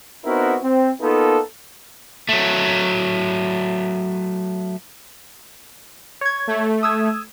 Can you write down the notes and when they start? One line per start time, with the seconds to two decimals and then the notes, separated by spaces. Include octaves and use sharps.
0.24 B3 C4 D#4 E4 F#4 A#4
0.62 C4
1.01 A#3 B3 D#4 F4 A4
2.29 F#3 A3
6.21 C#5 G#6
6.47 A3
6.83 D#6 E6 G#6